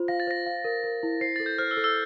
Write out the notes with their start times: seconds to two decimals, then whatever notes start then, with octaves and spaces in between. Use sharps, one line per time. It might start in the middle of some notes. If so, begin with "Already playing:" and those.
Already playing: F4 C5
0.08 F5 A#6
0.20 A6
0.27 C5 A#6
0.46 F5
0.65 A#4
0.84 A#4
1.03 E4
1.21 C5 C7
1.36 A4 A6
1.46 G6
1.58 C5 F6
1.71 E6
1.77 A4
1.84 E6